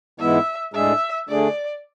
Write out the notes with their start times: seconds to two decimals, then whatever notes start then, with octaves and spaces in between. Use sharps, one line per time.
0.19 G#2 E3 G#3 B3 E4 E5
0.74 A2 G#3 D4 G#4 E5
1.29 D3 A3 D4 G#4 D5